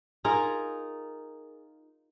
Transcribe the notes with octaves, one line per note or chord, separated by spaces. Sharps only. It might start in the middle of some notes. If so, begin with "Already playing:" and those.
D#4 F4 G#4 A#4